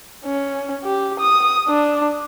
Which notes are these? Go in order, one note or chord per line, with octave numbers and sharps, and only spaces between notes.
C#4
G4
D#6
D4